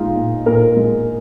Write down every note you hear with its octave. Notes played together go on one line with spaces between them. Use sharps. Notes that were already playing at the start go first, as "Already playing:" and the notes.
Already playing: A#2 G#3 D#4 F4
A#2
A#2 A#4
G#3